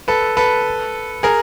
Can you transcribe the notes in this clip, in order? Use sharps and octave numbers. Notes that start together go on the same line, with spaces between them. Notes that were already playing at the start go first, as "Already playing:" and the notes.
A4 B4
A4 B4
G#4 A#4